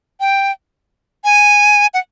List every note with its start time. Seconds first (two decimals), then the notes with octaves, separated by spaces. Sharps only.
0.20 G5
1.24 G#5
1.94 F#5